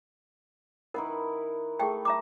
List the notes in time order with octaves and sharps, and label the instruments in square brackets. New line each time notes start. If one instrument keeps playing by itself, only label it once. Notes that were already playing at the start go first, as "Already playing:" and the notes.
[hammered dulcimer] D#3 E4 B4 [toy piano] A#4 F#5
[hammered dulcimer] A3 [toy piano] G#4 F#5 G5
[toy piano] E5 A#5 D6